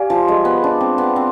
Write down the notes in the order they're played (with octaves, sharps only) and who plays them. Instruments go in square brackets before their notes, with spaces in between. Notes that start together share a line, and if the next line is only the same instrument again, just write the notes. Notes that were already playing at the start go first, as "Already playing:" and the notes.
Already playing: [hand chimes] G4 D5 F5 G#5
[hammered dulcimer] F3
G#3
B3
D4
C4
B3
C4